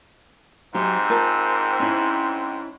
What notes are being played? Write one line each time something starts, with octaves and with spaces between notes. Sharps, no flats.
G#2 F#3 C4 G4 E5
F4 A#4 A5
C#4 E4